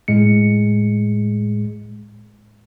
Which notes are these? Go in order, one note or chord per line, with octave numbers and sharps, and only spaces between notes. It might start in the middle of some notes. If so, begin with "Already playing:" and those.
A2 G#3 C#7